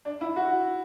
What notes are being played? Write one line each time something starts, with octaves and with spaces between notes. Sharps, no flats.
D4
E4
F#4